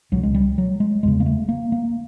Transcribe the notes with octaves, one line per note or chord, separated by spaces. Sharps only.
C#2 B2 F#3
G#3
G3
F#3
G#3
F#1 E2 C#3 G#3
A#3
A3
A#3
A#3